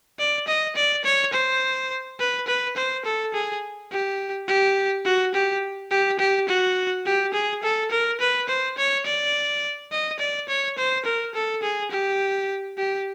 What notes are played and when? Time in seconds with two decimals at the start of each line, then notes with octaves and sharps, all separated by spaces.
0.19 D5
0.47 D#5
0.76 D5
1.05 C#5
1.33 C5
2.19 B4
2.47 B4
2.77 C5
3.05 A4
3.34 G#4
3.91 G4
4.47 G4
5.05 F#4
5.34 G4
5.91 G4
6.19 G4
6.49 F#4
7.06 G4
7.33 G#4
7.63 A4
7.91 A#4
8.20 B4
8.48 C5
8.77 C#5
9.06 D5
9.91 D#5
10.19 D5
10.48 C#5
10.78 C5
11.05 A#4
11.35 A4
11.63 G#4
11.91 G4
12.78 G4